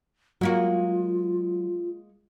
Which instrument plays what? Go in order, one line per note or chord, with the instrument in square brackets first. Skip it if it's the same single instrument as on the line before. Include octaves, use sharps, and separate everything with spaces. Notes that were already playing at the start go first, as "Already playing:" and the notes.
[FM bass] F#3 [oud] G#3 A#3 F#4 [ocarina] F4